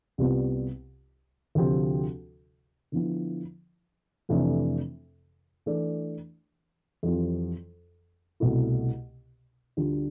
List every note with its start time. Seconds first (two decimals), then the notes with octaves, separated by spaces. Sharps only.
0.18 C2 C3 G3 B3 F4
1.55 D2 C3 F3 C4 G4
2.92 D3 F3 B3 E4
4.29 F2 C3 E3 A3 D4
5.66 E3 A3 D4 A4 D5
7.03 F2 E3 G3 C4 F4
8.40 C2 B2 A3 E4
9.77 D2 D3 G3 D4 F4